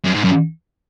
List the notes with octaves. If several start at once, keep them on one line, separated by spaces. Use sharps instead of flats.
F#2
G#2
F#2